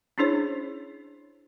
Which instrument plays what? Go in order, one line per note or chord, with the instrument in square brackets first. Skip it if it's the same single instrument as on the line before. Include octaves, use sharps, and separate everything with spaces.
[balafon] C#4 D4 E4 G#4 C5 C#5